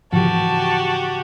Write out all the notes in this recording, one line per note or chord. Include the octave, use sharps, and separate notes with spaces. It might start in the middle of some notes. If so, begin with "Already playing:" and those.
G#2 C#3 E3 F3 F#4 G4 A5